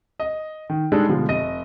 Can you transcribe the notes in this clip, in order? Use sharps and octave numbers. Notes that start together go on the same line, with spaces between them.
D#5
D#3
G3 G#3 D4 D#4 A4
B2 D3 F3 G3 G#3
F1 D#5 A#6 D#7